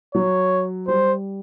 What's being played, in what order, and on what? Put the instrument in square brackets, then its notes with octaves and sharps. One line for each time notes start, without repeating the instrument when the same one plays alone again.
[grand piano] F#3 [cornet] C#5
[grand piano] G3 [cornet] C5